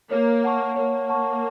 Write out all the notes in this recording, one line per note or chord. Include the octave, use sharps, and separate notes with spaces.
A#3 C#5
F#5 A5 C#6
A#3 C#5
F#5 A5 C#6